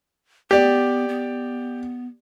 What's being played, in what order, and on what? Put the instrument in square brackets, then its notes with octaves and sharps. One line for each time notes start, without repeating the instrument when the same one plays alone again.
[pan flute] B3 [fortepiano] G4 D5
[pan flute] B3